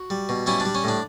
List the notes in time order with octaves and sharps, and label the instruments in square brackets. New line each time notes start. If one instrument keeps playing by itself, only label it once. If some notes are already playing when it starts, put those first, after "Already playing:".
Already playing: [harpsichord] F#4
G3
B2
G3 C#4 E4
D4
G3
C#4
A2 D4